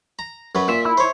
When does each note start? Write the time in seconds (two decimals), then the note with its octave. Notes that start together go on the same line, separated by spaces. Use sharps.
0.19 A#5
0.55 F#2 F#3 B4
0.68 A#2 E5
0.85 E4
0.97 C5 C#5